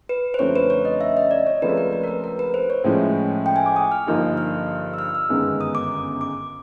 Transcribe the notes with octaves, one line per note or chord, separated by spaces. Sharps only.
B4
C5
F#2 D3 F3 A3 C4 C#5
B4
C#5
D#5
E5
D#5
D5
C#5
C#2 C#3 F3 A3 C4 B4
A#4
B4
B4
A#4
B4
A#4
B4
C5
C#5
A2 F3 G#3 C#4 E4
G5
G#5
D6
D#6
F6
G2 D3 F3 A#3 D#4
F6
E6
F6
E6
G1 F#2 D#3 G#3 B3
D#6
D6
D6